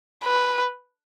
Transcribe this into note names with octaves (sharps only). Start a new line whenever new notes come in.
B4